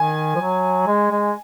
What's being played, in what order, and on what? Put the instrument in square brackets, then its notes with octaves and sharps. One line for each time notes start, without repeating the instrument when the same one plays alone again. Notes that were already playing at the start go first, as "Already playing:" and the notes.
Already playing: [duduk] D#3 [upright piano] G#5
[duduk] F3
F#3
G#3
G#3